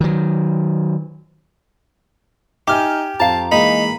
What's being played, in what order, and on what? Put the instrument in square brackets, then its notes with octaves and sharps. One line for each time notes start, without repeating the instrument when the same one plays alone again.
[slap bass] D#3 F#3
[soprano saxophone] D#4 [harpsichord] G4 [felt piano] E5 G#5 [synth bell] D6 F6
[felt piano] F2 [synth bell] F5 A#5 [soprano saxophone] A5
[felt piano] E3 G#3 A#3 [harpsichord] D#4 [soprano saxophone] B5